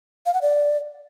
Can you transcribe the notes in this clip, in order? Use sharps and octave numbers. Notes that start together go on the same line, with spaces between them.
F5
F#5
D5